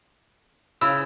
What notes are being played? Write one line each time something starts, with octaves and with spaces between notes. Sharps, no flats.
C#3 E4 E6